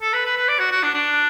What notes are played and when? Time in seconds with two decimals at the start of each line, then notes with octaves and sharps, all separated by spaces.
0.02 A4
0.13 B4
0.25 B4
0.37 B4
0.48 D5
0.59 F#4
0.71 F#4
0.83 D4
0.94 D4